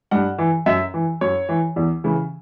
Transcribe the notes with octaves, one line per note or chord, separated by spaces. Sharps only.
G2 F#5
E3
F#2 E5
E3
F#2 C#5
E3
E2
C#3 E3